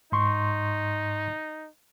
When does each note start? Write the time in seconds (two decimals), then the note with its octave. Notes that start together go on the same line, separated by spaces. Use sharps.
0.12 G#2 D#4 C6 C#6